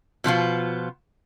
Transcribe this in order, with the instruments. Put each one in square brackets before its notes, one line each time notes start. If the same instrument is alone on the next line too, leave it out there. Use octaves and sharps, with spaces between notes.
[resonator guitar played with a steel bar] B2 F3 B3 F4